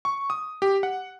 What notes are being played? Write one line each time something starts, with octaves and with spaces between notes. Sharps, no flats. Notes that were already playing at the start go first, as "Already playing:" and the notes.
C#6
D#6
G4
F#5